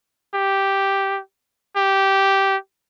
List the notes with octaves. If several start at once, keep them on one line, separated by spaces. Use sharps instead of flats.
G4
G4